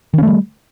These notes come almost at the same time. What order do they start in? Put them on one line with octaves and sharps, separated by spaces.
D#3 C#4 A3 G3